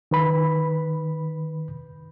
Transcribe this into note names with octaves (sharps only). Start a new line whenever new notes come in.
D#3 B4 B5